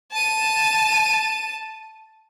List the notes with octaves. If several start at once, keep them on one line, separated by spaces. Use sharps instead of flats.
A5 D#7